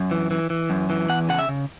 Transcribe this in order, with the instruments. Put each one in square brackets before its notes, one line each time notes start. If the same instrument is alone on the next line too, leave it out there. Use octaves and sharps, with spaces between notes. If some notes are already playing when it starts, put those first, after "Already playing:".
Already playing: [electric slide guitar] F#2
E3
E3
E3
F#2
E3
E2 F#5
C#3 F#5
E5
C#3